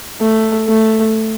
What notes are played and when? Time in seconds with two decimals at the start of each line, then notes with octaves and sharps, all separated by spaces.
0.20 A3
0.68 A3